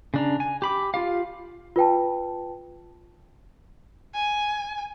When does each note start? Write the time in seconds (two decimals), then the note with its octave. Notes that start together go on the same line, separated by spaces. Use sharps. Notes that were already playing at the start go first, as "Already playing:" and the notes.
0.14 C#3 D4 A#5
0.40 G#5
0.62 G4 B5 D6
0.94 F4 G4 F5
1.76 F4 B4 G5 A5
4.14 G#5